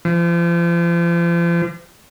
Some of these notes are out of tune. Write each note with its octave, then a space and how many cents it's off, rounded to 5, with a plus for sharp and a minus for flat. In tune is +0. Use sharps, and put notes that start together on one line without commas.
F3 -40